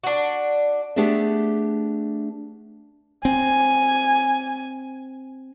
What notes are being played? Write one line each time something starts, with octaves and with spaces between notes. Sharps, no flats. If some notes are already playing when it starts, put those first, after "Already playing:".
D4 F#4
A3 B3 D4 G4 G#4 E5
C4 G#5